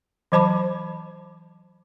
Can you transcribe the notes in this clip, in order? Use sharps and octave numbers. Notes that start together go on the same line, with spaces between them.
E3 F#3 C5 A5 B5 D6